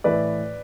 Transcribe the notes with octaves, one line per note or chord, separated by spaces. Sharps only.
A2 E3 B4 D5